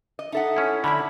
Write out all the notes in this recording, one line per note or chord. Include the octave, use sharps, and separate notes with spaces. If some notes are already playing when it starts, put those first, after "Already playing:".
D#5
D#4 A4 E5 F#5
C#4 E4
D3 E4 B5